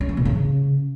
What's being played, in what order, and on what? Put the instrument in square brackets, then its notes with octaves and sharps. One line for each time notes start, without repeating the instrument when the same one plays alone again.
[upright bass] C#4
E3
B2
C#3